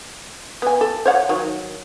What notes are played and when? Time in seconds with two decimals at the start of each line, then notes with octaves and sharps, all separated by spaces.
0.62 B3 G#5
0.81 A4
1.05 C5 C#5 F#5
1.29 D#3 F#3